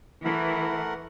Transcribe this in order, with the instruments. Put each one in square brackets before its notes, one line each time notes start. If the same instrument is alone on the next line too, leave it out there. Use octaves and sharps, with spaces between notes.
[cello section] E3 [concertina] A3 A#4 F#5 [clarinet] E4